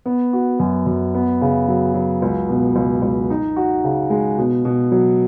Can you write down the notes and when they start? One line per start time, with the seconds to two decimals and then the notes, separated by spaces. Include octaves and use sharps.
0.06 B3
0.33 F#4
0.59 F#2
0.86 F#2
1.14 B3
1.41 C#3
1.68 F#3
1.94 F#3
2.22 C#2
2.49 B2
2.76 C#2
3.02 C#2
3.30 D#4
3.57 F#4
3.84 C#3
4.10 G#3
4.38 B2
4.65 B2
4.92 F#3